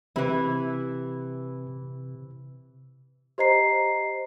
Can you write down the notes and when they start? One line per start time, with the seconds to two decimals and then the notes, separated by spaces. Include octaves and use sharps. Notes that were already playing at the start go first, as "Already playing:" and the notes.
0.16 C3 E3 C4 E4 G4 B4
3.38 G4 C5 D#5 A#5 C7